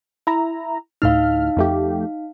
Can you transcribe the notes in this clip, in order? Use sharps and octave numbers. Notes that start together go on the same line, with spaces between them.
E4 A#5
D2 A2 D#4 F5 F6
F2 A3 G4